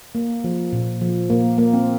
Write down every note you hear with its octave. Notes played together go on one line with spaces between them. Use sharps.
A#3
F3
A#2
F3
A#2 A#3
A#3
C4